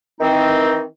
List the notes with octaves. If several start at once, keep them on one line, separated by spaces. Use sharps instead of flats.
D#3 E3 C4 D#4